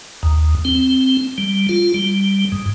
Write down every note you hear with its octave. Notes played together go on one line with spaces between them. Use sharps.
D#2
C4
G3
F4
G3
G#2